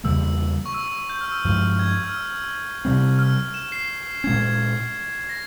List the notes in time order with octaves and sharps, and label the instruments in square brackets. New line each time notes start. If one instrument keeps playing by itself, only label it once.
[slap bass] E2 C#3 G3 A#3 [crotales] E6
[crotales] C#6
E6
E6
G6
F6
E6
[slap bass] G2 F3 G#3 [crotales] F6
[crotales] G#6
F6
E6
[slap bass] C3 G3 C4
[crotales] F6
E7
C7
[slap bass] A#2 G#3 C#4 [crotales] G#6
[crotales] G#6
A#6